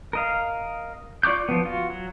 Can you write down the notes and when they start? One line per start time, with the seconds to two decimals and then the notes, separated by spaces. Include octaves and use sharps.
0.13 A#4 D#5 F5
1.23 F4 D5 C#6 D6 G6
1.49 F3 B3
1.65 F4 F#4
1.90 F#3